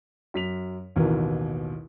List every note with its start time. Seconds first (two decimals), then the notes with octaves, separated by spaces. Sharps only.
0.34 F#2 B6 F7
0.96 A1 D#2 B2 E3 A#4